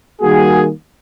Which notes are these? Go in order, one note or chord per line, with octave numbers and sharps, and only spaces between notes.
D#3 G3 A#3 F#4 G#4